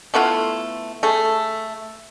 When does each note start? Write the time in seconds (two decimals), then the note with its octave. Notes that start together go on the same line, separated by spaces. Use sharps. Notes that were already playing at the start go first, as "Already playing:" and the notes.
0.14 A3 B3 E4 F4
1.03 A3 G#4